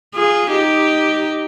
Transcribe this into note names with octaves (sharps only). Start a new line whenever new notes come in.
F4 G#4
D#4 G4